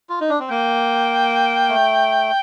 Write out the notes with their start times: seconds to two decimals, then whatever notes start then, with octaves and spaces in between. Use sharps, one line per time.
0.09 F4
0.21 D#4
0.29 D4
0.39 C4
0.50 A#3 G5
1.69 A3